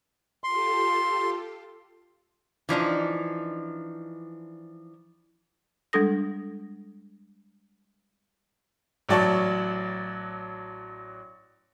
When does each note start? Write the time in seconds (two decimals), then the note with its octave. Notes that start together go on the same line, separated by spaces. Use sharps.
0.44 F4 G4 A4 C6
2.69 E3 F3 D4 D#4
5.93 G3 G#3 D4 A4 D#6 A#6
9.09 A1 F#3 D5 A5 C#6